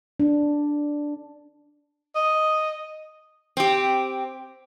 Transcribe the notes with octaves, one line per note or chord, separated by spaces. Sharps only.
D4
D#5
C4 G4